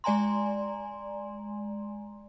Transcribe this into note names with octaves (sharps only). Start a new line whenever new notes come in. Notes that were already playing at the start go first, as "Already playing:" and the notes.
G#3 D5 G#5 A#5 C6